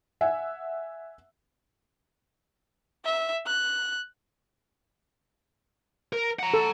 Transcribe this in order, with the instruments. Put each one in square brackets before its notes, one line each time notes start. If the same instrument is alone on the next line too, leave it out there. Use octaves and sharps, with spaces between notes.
[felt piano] E5 F#5 G#5
[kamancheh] E5
F#6
[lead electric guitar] A#4
F#5 A#5
[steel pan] A4